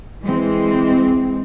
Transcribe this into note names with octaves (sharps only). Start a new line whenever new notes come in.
E3 G#3 C4